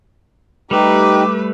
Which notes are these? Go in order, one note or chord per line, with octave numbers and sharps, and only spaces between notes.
G3 A3 D#4 G4 B4 D6